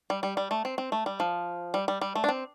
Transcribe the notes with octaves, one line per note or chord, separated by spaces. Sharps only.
G3
G3
G3
A3
C4
C4
A3
G3
F3
G3
G3
G3
A3
D4
C4